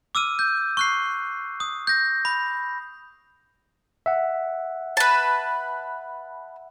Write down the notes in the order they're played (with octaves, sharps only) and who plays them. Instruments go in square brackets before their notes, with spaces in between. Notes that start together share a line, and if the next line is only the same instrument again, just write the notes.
[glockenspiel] D6 E6 F6 D#7
G6
C#6 F#6 C7
D#6
G6 A#6
B5
[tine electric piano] E5 F#5
[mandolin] B4 A5